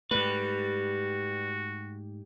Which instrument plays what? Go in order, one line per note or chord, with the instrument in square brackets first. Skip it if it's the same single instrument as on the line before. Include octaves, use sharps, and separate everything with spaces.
[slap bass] G#2 A3 [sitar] G3 [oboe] F#4 [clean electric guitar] B4